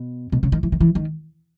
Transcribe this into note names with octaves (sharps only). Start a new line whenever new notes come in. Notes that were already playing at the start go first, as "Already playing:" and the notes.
Already playing: B2
B2
C#3
D#3
E3
D#3
E3
D#3